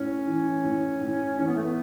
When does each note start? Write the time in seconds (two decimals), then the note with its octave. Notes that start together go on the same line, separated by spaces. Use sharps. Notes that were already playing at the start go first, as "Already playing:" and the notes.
Already playing: A2 C#4
0.27 E3
0.64 A2
1.01 A2
1.38 E3 C#4
1.47 B3
1.55 A3
1.64 B3